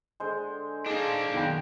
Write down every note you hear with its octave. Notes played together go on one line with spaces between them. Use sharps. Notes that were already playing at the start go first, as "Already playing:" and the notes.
D3 G#3 C5
A#3 D4 D#4 G#4
F#2 B2 D#3 F#5 G5 B5